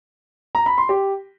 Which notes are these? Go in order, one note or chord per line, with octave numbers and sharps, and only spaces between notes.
A#5
B5
C6
G4